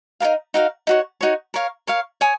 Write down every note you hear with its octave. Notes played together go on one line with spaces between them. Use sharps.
D#4 F#4 A#4 F5
D#4 F#4 A#4 F5
D#4 F#4 C#5
D#4 F#4 C#5
A#4 C#5 F5
A#4 C#5 F5
C#5 G#5 D#6